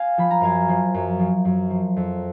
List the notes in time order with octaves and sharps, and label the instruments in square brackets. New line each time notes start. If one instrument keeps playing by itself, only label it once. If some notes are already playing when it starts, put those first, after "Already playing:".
Already playing: [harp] F5 G#5
F3 B5
A#5
F#2 F5 G#5
F3
F#2
F3
F#2
F3
F2